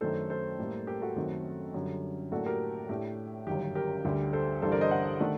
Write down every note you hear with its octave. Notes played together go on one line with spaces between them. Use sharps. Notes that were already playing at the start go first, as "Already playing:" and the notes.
F#2 D#3 A3 D4 A4 C5
A4 C5
A2 G3 A#3
G4 A#4
F#4 A4
F#2 D#3 A3 C4
F#2 D3 G3
A2 F#3 A#3 D4 F#4 A4
G4 A#4
A2 A3 D4 G4
G1 F#2 D#3 G4
G4 A#4
D2 D3 G3
A4 C5
A1 G2 D3 G3 D4 A4 C5
A#4 D5
C5 D#5
D5 F#5
D#3 A3 D4